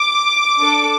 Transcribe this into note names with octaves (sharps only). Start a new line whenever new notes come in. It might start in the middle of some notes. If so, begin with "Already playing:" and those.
Already playing: D6
D4 A4